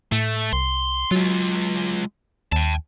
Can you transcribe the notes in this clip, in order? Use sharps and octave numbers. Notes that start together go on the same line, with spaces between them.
A2 A3
C2 C6
F#3 G#3 F4
D#2 G5 A5